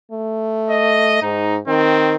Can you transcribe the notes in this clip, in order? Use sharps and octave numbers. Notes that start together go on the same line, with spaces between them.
A3
D#5
G#2 D#4
D#3 C4